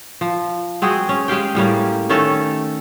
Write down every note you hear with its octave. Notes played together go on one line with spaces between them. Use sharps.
F3
G#3 C4 F#4 G#4
C#4
G#3 G4 F5 G5
A2 G3 A#3 C#4
D#3 A3 C#4 A4